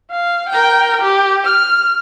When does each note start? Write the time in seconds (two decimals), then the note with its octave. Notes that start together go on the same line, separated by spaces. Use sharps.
0.11 F5
0.49 A#4 G5
1.02 G4
1.45 F6